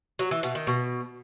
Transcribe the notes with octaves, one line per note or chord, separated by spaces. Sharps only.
F#3
E3
B2
D#3
B2